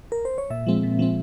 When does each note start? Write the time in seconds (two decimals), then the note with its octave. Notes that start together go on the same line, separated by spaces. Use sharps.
0.12 A#4
0.25 C5
0.38 C#5
0.50 A#2 E5
0.67 F3 G#3 C4
0.83 A#2
0.99 F3 G#3 C4